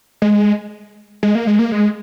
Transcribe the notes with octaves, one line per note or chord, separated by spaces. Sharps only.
G#3
G#3
A#3
G#3
A#3
G#3